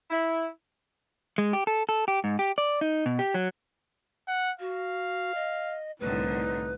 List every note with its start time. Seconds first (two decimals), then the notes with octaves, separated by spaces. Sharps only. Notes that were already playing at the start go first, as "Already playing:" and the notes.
0.11 E4
1.38 G#3
1.53 G4
1.67 A4
1.89 A4
2.08 G4
2.24 G#2
2.39 G4
2.58 D5
2.81 D#4
3.06 B2
3.19 G4
3.34 F#3
4.28 F#5
4.60 F#4 F5
5.35 D#5
6.00 C2 A2 D3 D#4 B4